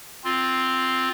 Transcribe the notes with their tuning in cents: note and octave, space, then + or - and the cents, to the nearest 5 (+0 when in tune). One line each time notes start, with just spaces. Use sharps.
C4 +0 F4 +0